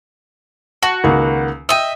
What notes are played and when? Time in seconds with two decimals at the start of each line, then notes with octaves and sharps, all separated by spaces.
0.83 F#4 A5
1.04 C#2 D#3 A#3
1.69 D#5 E5 G5 D#6